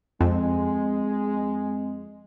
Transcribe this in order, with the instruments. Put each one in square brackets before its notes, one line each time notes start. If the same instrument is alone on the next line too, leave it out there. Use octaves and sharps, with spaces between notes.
[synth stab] F2 [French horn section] G#3 [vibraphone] C4